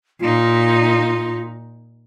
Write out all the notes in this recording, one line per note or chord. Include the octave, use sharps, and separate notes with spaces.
A#2 D#4 F4